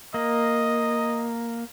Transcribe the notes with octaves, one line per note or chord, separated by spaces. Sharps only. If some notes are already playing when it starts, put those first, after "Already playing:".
A#3 D#5